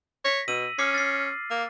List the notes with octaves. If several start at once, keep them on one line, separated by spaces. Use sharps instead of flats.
C#5 A#6 B6
B2 E6 D#7 F#7
C#4 D6 F6 C7
A6 C7
A#3